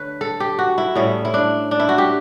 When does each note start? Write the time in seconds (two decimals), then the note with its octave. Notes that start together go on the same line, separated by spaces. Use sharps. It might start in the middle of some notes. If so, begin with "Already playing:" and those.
Already playing: D3 A3 B4 C#5
0.21 A4
0.40 G4
0.59 F#4
0.78 E4
0.96 A2 G3 C#4 E4
1.25 E4
1.34 D4
1.71 D4
1.80 E4
1.89 F#4
1.98 G4